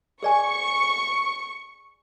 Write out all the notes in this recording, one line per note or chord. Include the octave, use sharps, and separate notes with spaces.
G#4 D5 G#5 C#6